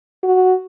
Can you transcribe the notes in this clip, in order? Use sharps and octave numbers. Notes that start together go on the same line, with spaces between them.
F#4